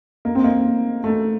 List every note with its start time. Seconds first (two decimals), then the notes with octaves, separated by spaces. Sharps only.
0.25 A#3
0.35 C4
0.44 A#3
1.04 A3